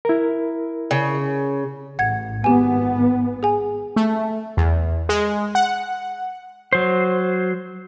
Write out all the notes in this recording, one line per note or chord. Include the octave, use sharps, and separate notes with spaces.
E4 A#4
C#3
A1 F#5 G#6
G#1 B3 G4 G#5
G#4 G#5
A3
E2
G#3
F#5
F#3 C5